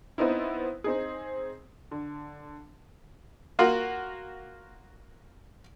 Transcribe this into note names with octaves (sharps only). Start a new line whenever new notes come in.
B3 C4 D#4 E4
C4 D#4 G#4
D3
A#3 F4 F#4